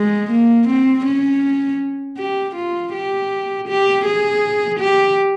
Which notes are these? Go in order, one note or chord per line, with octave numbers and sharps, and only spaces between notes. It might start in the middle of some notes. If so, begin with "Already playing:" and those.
Already playing: G#3
A#3
C4
C#4
G4
F4
G4
G4
G#4
G4